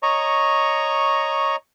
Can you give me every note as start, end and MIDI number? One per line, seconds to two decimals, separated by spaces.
0.03 1.56 73
0.03 1.56 75
0.03 1.56 82
0.03 1.56 85